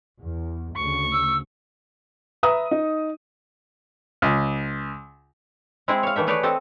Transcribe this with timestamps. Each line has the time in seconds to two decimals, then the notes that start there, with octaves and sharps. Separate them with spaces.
0.21 E2
0.76 D2 C#3 C#6
1.12 E6
2.43 B4 E5 A#5 D#6
2.71 D#4
4.22 C#2
5.88 G#3 C4 E4 G#4
6.03 C#5 F5
6.16 D#3 E3 A3 E5
6.27 A3 G#4 B4 C#5 D5
6.43 C4 A4 D#5 A5